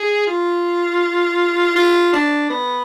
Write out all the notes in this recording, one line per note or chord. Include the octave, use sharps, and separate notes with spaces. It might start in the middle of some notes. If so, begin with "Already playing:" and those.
Already playing: G#4
F4
F4
D4
B3